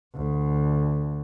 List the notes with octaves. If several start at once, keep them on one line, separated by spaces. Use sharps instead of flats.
D2